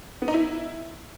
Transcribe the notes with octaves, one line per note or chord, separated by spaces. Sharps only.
B3
D#4
E4